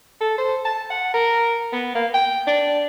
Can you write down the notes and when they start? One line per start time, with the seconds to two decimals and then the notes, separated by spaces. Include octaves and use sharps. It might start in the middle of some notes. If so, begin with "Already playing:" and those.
0.21 A4
0.38 C5
0.65 A5
0.90 F#5
1.14 A#4
1.73 B3
1.95 A#3
2.14 G5
2.47 D4